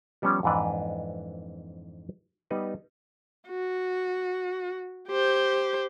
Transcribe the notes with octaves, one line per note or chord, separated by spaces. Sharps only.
F3 G3 B3 C#4
F2 G#2 E3 D4 B4
G3 B3 D#4 B4
F#4
G4 C5